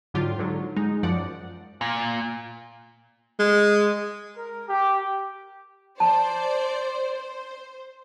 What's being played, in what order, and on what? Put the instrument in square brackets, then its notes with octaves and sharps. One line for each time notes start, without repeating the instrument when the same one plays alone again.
[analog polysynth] G#2 D3 F#3 F4 G4
G#2 D3 F#3
G#3 D#4
F#2 F3 D5 F#5
[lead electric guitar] A#2
[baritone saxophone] G#3
[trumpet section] A#4
G4
[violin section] C5 D5 [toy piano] A5
[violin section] C5